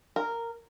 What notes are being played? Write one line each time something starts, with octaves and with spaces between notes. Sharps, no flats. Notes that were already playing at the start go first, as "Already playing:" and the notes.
A#4